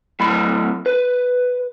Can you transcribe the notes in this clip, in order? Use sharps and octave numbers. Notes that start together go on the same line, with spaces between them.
A2 F#3 B5
B4